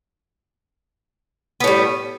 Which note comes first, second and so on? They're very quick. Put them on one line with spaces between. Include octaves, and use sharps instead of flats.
B3 A2 G3